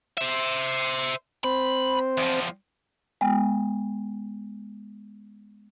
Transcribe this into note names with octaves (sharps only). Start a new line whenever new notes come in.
C5 E5
C4 C5 B5
E2 F3
G#3 B3 G5